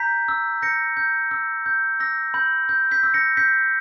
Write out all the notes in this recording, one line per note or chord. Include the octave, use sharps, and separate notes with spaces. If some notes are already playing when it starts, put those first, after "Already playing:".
Already playing: A#5 G6 B6
E6
G6 A#6 C#7
G6
E6
G6
E6 A#6
B5 G6
G6
G6 B6
E6
A#6 C#7
G6 B6